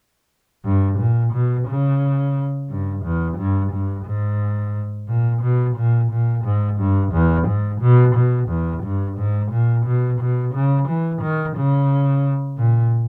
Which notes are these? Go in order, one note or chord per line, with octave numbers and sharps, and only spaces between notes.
G2
A#2
B2
C#3
G2
E2
G2
G2
G#2
A#2
B2
A#2
A#2
G#2
G2
E2
G#2
B2
B2
E2
G2
G#2
A#2
B2
B2
C#3
E3
D#3
C#3
A#2